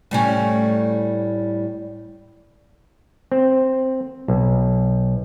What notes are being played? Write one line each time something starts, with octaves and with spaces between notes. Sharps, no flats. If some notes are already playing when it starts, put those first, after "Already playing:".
A2 G3 C#4
C4
B1